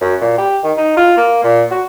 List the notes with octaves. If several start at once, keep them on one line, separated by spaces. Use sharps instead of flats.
F#2
A#2
G4
D#3
D#4
F4
A#3
A#2
F#4